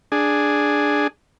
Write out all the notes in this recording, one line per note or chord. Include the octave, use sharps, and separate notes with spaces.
D4 G#4